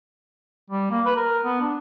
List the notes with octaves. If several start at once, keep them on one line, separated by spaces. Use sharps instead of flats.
G3
A#3
B4
A#4
B3
D4